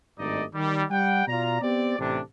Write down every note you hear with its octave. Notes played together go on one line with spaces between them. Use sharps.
G#1 G2 A3 D#4 D5 D#5
D#3 G3
G3 F#5 G5
B2 F4 D5 A#5
B3 C4 G4 D5
A1 C3 A3 D4